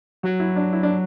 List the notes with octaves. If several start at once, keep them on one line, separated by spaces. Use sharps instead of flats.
F#3 F#4
E4
D4
E4
D4